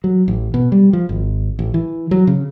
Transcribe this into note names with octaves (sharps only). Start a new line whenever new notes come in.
F#3
A1
B2
G3
F3
G#1
A1
E3
F#3
C#3